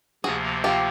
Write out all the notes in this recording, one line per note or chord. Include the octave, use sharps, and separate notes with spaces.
D2 C3 F3 A#3 F#4 G#4
F4 G4